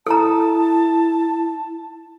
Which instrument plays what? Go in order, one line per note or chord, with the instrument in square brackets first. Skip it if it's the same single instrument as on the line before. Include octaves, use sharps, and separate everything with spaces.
[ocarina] E4 [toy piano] A4 A#5 [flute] A5